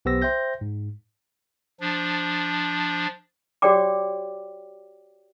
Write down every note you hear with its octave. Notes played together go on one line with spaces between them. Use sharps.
B1 B3 G4 C5 E6 A#6
C5 E5 G5 G6 A#6
G#2
F3 D4
F#4 G4 C#5 D5 G5 D6